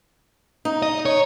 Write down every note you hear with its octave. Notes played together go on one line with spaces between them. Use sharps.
D#4
D#5
C#5